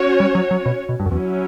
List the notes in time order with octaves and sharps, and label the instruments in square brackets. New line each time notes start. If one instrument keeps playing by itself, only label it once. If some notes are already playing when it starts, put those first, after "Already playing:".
Already playing: [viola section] C#4 F#4 C#5
[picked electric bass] G3
F#3
F#3
B2
B2
G2
F#2
[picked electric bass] E2 [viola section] F#3 C#4 E4